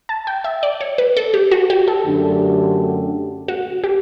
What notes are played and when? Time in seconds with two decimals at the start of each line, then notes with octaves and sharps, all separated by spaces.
0.09 A5
0.27 G5
0.44 E5
0.63 D5
0.81 C#5
0.98 B4
1.17 A4
1.34 G4
1.51 F#4
1.70 G4
1.88 A4
2.06 F#2 D3 A3 D4 G4
3.48 F#4
3.84 G4